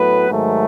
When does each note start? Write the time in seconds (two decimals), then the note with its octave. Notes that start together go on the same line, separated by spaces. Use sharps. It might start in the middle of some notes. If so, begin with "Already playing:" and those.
Already playing: A2 F#3 A3 B3 B4
0.30 G#2 D#3 F#3 A3